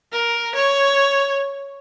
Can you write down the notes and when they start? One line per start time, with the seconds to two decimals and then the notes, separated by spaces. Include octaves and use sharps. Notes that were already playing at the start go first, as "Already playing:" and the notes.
0.13 A#4
0.56 C#5